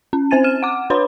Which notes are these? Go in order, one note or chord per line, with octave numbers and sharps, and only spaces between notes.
C#4
C4 C5 G#5 A6 D#7
F6 D#7 E7
F#5 D6
D4 B4 C#5 B5 C6